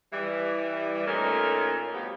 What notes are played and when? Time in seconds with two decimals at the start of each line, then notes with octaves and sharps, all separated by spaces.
0.12 E3 G3
1.06 A#2 A3 C#4 D#4 A4 A#4
1.93 G2 B2 F3 B3 G4